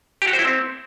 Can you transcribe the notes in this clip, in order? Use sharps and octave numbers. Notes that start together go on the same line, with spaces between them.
G4
F#4
C5
E4
C4